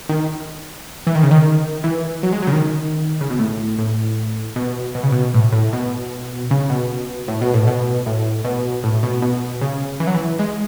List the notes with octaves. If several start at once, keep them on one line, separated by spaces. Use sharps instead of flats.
D#3
E3
D#3
C#3
D#3
E3
F#3
G#3
F#3
C#3
D#3
C#3
B2
A2
A2
B2
B2
C#3
B2
A2
A2
B2
C#3
B2
A2
B2
A2
B2
A2
B2
A2
B2
B2
C#3
E3
F#3
E3
G#3